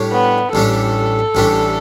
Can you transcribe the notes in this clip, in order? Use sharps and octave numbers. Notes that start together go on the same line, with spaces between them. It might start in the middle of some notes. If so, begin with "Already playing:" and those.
Already playing: A2 G3 D4 G4 C#5
B3
A1 A2 G3 D4 A4
A1 A2 G3 D4